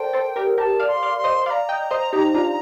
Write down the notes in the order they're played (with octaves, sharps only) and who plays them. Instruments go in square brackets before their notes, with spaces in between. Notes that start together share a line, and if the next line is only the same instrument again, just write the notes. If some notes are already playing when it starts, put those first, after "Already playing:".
Already playing: [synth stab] A4 A#4 C5 D5 [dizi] G5
[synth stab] A4 C5
G4 A#4
[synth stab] G4 A#4 [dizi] A5
[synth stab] D5 F5
[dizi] C6
[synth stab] D5 F5
[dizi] C6
[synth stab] C5 D#5
[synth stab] D5 F5 [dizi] C6
[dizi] A#5
[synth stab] D#5 G5
C5 D#5
D#4 G4
D4 F4